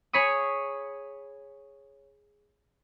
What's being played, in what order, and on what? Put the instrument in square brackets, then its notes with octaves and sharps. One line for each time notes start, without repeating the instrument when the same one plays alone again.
[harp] G#4 C#5 B5 C#6 D#6